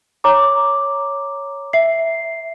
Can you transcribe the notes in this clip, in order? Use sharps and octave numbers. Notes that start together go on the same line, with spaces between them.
C#5 A#5 D6
E5 C7